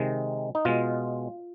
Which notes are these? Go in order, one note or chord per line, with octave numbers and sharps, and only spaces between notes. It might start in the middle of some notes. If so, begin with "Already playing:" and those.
Already playing: C3 D#3 G#3
D#4
B2 G#3 F4